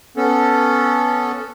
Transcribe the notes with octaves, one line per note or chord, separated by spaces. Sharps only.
B3 C#4 A4